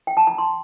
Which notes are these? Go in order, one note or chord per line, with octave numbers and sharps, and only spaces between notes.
G5
A5
A#5
C6